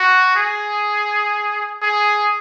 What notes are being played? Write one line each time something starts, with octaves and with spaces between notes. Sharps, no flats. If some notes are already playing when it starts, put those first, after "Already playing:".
Already playing: F#4
G#4
G#4